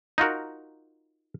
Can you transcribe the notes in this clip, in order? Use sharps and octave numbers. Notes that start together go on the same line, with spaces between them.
D#4 F4 F#4 A#4